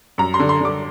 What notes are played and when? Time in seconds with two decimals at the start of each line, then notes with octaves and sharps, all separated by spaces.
0.18 F#2 A#5
0.34 C6
0.40 D3
0.49 C6
0.60 D3 D6